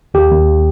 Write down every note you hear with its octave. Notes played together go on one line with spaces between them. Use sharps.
D#2 G4
D#2